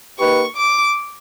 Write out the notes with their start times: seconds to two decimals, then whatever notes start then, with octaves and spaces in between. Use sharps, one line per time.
0.19 A#3 D#4 G4 B4 C#6
0.56 D6